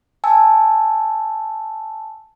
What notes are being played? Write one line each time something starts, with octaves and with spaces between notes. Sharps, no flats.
G#5 A5 E6